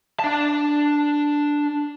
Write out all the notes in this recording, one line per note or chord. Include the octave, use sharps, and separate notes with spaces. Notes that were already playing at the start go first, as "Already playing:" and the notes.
D4 A5